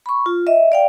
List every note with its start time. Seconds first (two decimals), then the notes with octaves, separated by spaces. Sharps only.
0.06 B5 C#6
0.26 F4
0.47 D#5 E5
0.72 D5 F5 G5